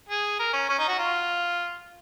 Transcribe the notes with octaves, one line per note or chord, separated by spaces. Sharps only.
G#4
A#4
C#4
C#4
D#4
F#4
F4